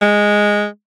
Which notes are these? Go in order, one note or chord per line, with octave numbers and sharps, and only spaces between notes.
G#3